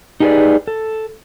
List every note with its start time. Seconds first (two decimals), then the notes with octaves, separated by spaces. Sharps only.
0.20 D#4 G4 G#4 A#4 B4 D5
0.68 A4